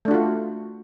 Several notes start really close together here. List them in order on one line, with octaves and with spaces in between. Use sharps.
A3 D4 F#4 F4